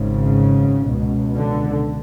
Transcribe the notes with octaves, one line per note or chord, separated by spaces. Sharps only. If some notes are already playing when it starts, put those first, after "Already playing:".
Already playing: G#1 G#2 C#3
C#2 B2
D3